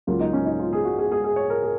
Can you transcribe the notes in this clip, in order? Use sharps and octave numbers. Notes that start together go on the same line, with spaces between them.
C#2 C#3 F#3 A#3 F4
D#4
C#4
D#4
F4
G#4
F#4
G#4
G#4
G#4
C#5
A#4
G#4